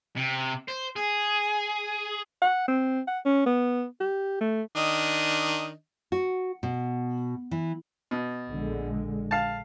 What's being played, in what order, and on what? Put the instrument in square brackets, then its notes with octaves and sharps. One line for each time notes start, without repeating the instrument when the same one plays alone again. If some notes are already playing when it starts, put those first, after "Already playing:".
[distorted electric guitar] C3
C5
G#4
[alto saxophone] F#5
C4
F#5
C#4
B3
G4
A3
[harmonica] D#3 D4 D#5
[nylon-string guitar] F#4
B2
E3
[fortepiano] B2
[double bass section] A#1 D3 G#3
[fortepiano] F5 A5